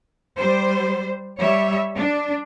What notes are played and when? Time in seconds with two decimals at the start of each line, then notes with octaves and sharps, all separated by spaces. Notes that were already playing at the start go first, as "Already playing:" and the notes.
0.37 G3 C5
1.37 G3 C#5 E5
1.98 D4